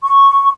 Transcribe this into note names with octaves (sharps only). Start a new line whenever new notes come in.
C#6